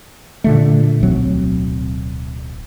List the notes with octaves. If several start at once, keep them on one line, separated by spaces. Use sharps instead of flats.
A#2 D3 A3
D1 B1 F#3 C4